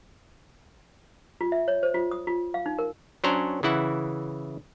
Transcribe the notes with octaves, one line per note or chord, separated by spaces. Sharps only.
F4
E5
C#5
C5
F4
D#6
F4
F5
D#4
A#4
F#3 C#4 D4 C5 A#5
C#3 E3 E4 F#5